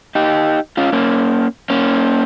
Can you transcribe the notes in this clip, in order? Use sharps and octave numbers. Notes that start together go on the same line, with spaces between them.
D#4 G4
C#4 F4
A#3 C#4
A#3 C#4